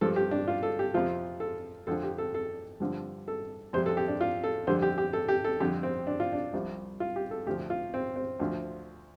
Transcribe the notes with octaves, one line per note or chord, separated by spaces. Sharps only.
G2 F3 A4
G4
D4
F4
A4
G4
F2 C3 F3 F4
A4
F2 D3 F3 A4
G4
A4
A4
G2 D3 F3
A4
F2 C3 G3 C5
A4
G4
D4
F4
A4
F2 D3 G3 C5
G4
G4
A4
G4
A4
F2 D3 G3 G4
C4
D4
F4
D4
C2 C3 F3
F4
G4
A4
D2 C3 F3 G4
F4
C4
C4
D2 D3 F3